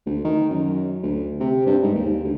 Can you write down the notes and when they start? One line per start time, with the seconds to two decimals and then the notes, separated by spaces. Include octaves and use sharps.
0.06 D2
0.24 D#3
0.50 F#2
1.03 D2
1.40 C3
1.67 G2
1.83 G#2
1.95 D#2
2.24 D2